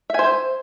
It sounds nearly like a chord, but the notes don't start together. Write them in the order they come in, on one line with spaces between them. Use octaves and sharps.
E5 G#5 C5